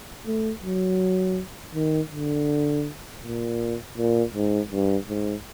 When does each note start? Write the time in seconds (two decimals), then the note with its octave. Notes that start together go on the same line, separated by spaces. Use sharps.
0.26 A3
0.62 F#3
1.75 D#3
2.12 D3
3.23 A#2
3.97 A#2
4.34 G#2
4.71 G2
5.09 G#2